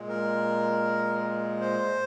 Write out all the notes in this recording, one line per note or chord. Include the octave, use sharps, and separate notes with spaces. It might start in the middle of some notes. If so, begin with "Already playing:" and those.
Already playing: A#2 G#3
A#4
C5